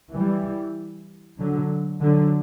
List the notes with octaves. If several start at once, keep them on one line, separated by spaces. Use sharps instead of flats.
E3 G3
D3 F#3
D3 F#3